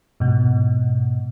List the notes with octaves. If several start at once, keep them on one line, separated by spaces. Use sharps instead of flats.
G#2 B2